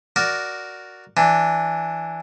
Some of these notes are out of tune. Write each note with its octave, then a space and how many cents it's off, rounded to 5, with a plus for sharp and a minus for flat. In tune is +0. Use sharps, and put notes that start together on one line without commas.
F#4 +0 A#4 +0 D5 +0
E3 +0 D4 +0